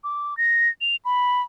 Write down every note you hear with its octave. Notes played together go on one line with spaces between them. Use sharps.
D6
A#6
F7
B5